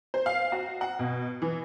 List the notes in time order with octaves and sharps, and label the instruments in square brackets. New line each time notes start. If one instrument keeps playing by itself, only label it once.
[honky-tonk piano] C5
F5
F#4
F#5
B2
E3